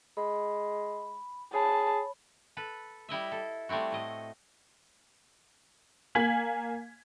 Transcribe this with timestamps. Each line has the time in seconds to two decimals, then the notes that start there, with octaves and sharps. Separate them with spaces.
0.17 G#3 B5
1.53 G#4 C#5 A5 B5
2.57 A4 B4
3.09 G3 E4 D#5 E5
3.32 A4
3.69 G3 A3 C4 E4 F#4
3.92 A2 D#5
6.15 A#3 F5 G#5 G#6 B6 F#7